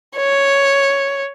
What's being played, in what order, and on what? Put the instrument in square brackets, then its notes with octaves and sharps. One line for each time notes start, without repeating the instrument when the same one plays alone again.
[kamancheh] C#5